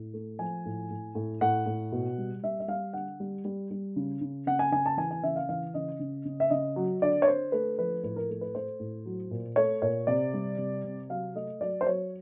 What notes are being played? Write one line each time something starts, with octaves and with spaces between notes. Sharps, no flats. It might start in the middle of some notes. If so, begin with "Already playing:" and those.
Already playing: A2
A3
F3 G#5
A2
A2
A2
A2 F#5
A2
B2
G3
G3 E5
E5
G3 F5
D3 F#5
G3
G3
G3
C#3
C#3
C#3 F#5
G#5
C#3 G#5
A5
E3 G#5
G#5
C#3 E5
F5
E3 F5
C#3 D#5
C#3
C#3
E5
C#3 D#5
F#3
D3 D5
C#5
D3 C5
A3 B4
F3 B4
A2 B4
A#4
A3
B4
A3 C5
A2
F#3
A#2
A3 C#5
A#2 C#5
C3 D5
G3
C3
C3
F#3 F5
A3 D#5
F#3 D5
C5
F#3 C#5